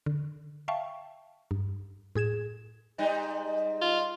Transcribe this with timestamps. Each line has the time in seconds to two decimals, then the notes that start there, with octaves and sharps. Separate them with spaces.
0.06 D3
0.68 E5 F5 G5 A5 C#6
1.51 G2
2.15 A2 G#4 G#6 E7
2.98 G#2 G3 D#4
3.81 F4